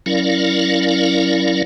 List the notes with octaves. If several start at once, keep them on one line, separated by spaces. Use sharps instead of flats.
F#3 C#4 E4 A#4 D5 F5